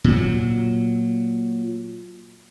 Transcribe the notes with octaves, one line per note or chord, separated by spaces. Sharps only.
A#2 F#3